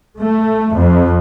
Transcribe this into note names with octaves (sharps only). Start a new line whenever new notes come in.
A3
F2